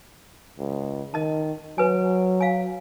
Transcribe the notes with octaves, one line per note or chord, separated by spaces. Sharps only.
C#2
D#3 D#5 A5
F#3 B4 G#5
F5 G#5